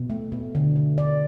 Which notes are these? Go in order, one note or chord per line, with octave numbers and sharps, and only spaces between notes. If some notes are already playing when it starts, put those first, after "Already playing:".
Already playing: B2
A3
B2
D3
D3
D3 D5